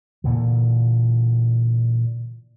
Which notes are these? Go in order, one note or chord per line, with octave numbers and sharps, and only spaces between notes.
A#2 D3 E3